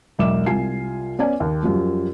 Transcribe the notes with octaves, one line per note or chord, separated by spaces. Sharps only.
E1 B1 E5 D6 E7
C2 F4 G#5 C7
B3 C#4 D5 G#5
D#2
F#2 F3 G3